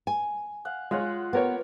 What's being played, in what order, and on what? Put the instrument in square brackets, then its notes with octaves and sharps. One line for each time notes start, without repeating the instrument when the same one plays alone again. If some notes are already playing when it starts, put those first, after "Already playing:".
[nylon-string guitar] G#5
[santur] F5 F#5
[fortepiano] G#3 C#5 [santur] F4 F5 F#5
[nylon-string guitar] B3 [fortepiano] G4 A#4 C#5